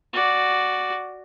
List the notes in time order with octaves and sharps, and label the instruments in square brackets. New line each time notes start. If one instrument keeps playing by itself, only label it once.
[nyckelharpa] F#4 D5